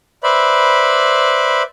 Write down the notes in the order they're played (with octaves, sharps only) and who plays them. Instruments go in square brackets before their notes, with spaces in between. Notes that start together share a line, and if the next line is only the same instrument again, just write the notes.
[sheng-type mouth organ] B4 C5 D5 E5 B5